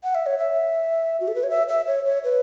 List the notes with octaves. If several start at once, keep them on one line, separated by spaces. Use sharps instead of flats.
F#5
E5
C#5
E5
F#4
A4
B4
C#5
E5
E5
C#5
C#5
B4